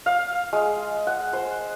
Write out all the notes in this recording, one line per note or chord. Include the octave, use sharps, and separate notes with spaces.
F5
G#3
F#5
C5